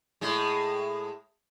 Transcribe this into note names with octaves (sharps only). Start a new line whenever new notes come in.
A2 G#3